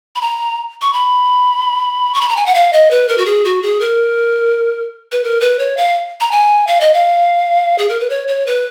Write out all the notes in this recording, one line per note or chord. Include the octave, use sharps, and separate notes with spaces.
B5
A#5
C#6
B5
C#6
B5
A#5
G#5
F#5
F5
D#5
B4
A#4
F#4
G#4
F#4
G#4
A#4
B4
A#4
B4
C#5
F5
A#5
G#5
F5
D#5
F5
G#4
A#4
B4
C#5
C#5
B4